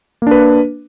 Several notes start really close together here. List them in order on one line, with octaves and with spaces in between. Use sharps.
A#3 D4 B4